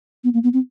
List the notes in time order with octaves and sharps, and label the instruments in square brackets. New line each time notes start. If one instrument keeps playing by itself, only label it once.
[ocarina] B3
A#3
B3
C4